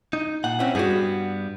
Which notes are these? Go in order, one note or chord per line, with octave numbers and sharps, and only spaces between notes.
D#4
A#2 F#5
C4 C#4 E4
G2 G3 B3 F#4 G#4